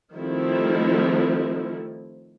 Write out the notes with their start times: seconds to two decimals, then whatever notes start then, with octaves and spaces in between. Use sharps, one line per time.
0.14 D#3 F3 G3 A3 C4 E4